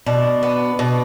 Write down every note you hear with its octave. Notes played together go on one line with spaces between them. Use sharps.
B2 D4
B3
B2